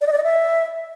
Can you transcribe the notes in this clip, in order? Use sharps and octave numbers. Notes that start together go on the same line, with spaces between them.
D5
D#5
D5
D#5
E5